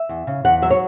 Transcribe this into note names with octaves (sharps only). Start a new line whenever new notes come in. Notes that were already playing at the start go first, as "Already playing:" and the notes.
Already playing: E5
E2
C#3
E2 F#5
F#3 E5
C#5